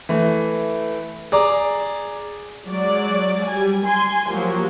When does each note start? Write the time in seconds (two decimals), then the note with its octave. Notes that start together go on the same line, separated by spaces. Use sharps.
0.09 E3 A3
1.32 G#4 D5 A#5 D6
2.68 F#3 G#3 D5
3.46 G3 G#5
3.83 G#5 C6
4.30 F3 F#3 A#3 G4